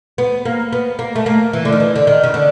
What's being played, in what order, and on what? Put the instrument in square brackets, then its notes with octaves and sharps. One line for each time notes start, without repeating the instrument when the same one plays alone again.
[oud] B3
A#3
B3
A#3
A3
A#3
E3
D3
D#3
E3
D3
D#3
C#3
D3